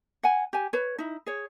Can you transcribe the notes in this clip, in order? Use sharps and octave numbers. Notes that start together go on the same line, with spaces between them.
F#5 G#5
G4 G#5
B4 C#5
D#4 E4
G#4 C#5